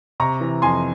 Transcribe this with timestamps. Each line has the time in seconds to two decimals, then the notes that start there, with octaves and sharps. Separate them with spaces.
0.20 C3 A#5 C#6
0.41 E3
0.62 F2 G#5 C6